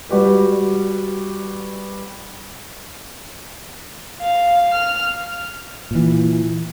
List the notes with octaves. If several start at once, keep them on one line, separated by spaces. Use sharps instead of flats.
G3 F#4 G4 B4
F5
F6
A#2 E3